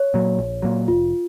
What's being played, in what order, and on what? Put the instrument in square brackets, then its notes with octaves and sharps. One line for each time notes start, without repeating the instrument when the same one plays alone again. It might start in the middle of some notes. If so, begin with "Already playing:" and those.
Already playing: [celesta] C#5
[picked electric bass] A#2 F#3
A#1
A#2 F#3
[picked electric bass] F1 [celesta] F4